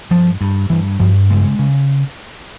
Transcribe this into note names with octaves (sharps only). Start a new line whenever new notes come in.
G2 F3
G2
G2 E3
G2 F3
C#3 G#3
C#3